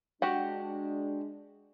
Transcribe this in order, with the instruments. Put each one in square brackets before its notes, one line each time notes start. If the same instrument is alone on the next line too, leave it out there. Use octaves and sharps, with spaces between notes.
[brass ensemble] G#3 D4 [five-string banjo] F#4 G4 F#5